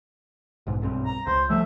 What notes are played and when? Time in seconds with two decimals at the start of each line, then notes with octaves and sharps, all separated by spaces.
0.67 B1 G#2
0.81 B1 G2 C4
1.06 A#5
1.27 C#2 C5
1.50 F3 G3 A3 E5